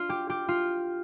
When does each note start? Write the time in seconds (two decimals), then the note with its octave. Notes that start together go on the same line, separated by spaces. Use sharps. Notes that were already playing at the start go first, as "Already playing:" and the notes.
Already playing: D4 F4
0.09 G4
0.30 G4
0.48 F4